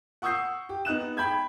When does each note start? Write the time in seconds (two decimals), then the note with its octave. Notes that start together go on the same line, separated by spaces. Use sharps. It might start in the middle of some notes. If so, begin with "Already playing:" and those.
0.22 F#5 C#6 D#6 E6 G6 C7
0.69 G4
0.85 B3 D#4 F#6 E7
1.17 G5 B5 G6 G#6